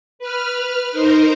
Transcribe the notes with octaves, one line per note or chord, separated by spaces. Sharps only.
B4 F6
D#4 A#4 C5